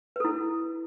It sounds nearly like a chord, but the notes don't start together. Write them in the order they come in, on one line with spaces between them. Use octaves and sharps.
B4 A4 E4